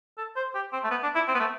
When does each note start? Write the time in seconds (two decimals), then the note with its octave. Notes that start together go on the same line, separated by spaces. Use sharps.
0.18 A4
0.36 C5
0.55 G4
0.73 C4
0.84 A3
0.91 B3
1.03 D4
1.15 E4
1.28 C4
1.35 B3
1.40 A3